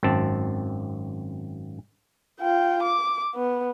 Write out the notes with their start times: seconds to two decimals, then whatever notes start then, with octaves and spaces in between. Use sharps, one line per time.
0.03 G#1 F#2 C4 A5
2.40 F4 G5
2.83 D6
3.35 B3